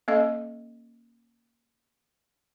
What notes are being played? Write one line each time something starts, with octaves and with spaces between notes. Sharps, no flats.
A#3 C#4 A4 D#5